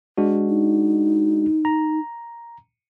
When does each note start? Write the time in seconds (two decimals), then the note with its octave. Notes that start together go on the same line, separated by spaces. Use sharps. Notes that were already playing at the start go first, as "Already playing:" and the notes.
0.18 G#3 D4 F#4
0.49 D#4
1.65 A#5